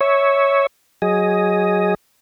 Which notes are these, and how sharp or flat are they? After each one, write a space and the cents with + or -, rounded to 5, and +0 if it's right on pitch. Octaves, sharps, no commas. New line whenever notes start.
C#5 +0 E5 -15
F#3 +0 G#4 +0 D#5 +5